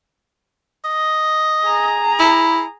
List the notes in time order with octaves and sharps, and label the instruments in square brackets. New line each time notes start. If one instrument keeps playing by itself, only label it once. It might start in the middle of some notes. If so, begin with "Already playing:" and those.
[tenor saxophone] D#5
[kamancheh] G#4 A#5
[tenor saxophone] E4